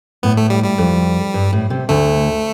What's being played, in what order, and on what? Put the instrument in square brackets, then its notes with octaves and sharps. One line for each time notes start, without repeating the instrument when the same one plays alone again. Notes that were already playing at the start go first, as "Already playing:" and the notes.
[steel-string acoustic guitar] A2 [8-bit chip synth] B3
[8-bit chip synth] A3
G3
G3
[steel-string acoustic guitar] F2
G2
A2
C3
[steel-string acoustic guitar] D2 D3 [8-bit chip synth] A3